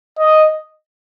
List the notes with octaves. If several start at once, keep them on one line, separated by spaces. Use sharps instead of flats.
D#5